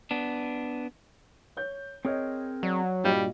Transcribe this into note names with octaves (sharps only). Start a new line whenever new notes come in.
B3 D4
C#5 G6
C4 G#4 A#4 C#5 D#5
F#3 D5
G2 A#2 G3 F#4 D#5